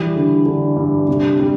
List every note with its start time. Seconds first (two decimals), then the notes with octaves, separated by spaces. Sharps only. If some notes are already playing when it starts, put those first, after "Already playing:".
Already playing: E3 G3
0.16 D3
0.46 D3
0.77 G2
1.08 C3
1.39 G3